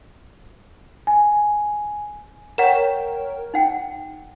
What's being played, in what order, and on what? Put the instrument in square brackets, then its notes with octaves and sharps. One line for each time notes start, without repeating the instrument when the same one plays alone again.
[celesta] G#5
[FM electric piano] A#4 C#5 G5 [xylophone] F#5 E7
[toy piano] D#4 F#5 G5